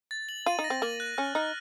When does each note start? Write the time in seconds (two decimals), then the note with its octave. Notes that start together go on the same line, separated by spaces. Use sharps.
0.11 A6
0.29 F#7
0.46 F4 D#7
0.59 D#4
0.64 A#6
0.70 C4
0.82 A#3 F#7
1.00 F#6
1.18 C#4 F6
1.35 D#4 F6